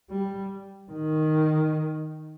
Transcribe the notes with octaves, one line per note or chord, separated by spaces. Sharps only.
G3
D#3